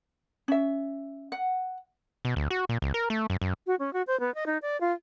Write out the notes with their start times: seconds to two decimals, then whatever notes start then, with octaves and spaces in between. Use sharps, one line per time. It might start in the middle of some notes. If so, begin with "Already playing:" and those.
0.48 C#4 E5
1.32 F#5
2.25 B2
2.36 D2
2.51 F#4
2.69 A#2
2.82 C#2
2.94 A#4
3.10 A3
3.30 F#2
3.42 F#2
3.67 F#4
3.79 C#4
3.93 F#4
4.07 C5
4.20 B3
4.35 D#5
4.46 D#4
4.62 D5
4.81 F4